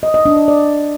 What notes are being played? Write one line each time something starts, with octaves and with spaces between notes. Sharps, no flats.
D#5
D#5
D4
D#5
D5